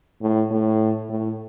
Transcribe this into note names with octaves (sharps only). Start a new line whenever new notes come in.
A2
A2
A2